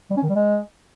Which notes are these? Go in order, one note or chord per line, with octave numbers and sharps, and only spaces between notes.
G3
C#4
D#3
G3
G#3